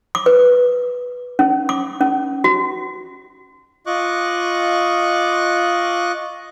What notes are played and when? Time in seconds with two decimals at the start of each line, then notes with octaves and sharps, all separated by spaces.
0.15 D6
0.26 B4
1.39 C#4
1.69 D6
2.01 C#4
2.44 F#4
3.86 F4 D#5 C#6 D6 F#6